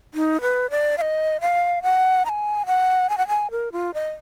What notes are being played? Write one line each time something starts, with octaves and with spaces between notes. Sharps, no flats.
D#4
B4
D5
F5
D#5
F5
F#5
A#5
G#5
F#5
G#5
F#5
G#5
A#4
F4
D#5